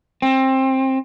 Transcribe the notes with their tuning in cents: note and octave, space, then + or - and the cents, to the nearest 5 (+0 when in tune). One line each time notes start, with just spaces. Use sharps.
C4 +20